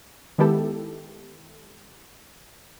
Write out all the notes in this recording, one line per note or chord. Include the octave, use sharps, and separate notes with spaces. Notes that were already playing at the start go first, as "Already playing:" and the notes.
D#3 G#3 B3 E4 G4 A4